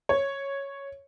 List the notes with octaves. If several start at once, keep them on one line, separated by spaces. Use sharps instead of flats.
C#5